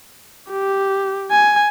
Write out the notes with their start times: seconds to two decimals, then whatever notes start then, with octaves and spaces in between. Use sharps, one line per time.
0.51 G4
1.32 G#5